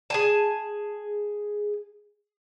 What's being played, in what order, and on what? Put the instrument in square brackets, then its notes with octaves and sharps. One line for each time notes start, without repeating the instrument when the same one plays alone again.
[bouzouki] G#4 G#5 A5